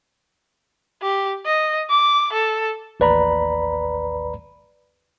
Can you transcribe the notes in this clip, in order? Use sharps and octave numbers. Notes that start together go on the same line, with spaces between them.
G4
D#5
D6
A4
A1 D#2 B4 D5 A#5 B5